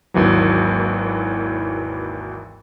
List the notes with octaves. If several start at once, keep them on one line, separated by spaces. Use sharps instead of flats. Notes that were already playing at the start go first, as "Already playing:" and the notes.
G#1 D#2 E3 F#3